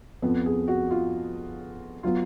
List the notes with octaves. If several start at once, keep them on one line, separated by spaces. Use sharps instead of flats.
F2 F3 B3
G#4
F#4
F4
F#3 B3 F4